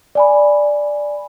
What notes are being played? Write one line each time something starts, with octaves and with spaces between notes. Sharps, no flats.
D5 G#5 B5